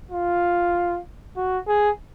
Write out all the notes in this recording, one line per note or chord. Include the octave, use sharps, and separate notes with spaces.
F4
F#4
G#4